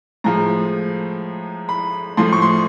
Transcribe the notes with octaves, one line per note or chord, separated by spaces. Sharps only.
A2 F3 G#3 A#5
B5
A2 F3 A3 C6
C#6
C6